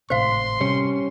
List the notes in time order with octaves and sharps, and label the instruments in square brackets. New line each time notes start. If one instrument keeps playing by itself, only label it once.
[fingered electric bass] G#1 A2 C3 [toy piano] C5 F5 [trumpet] C6
[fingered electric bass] C3 [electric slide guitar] G3 C#4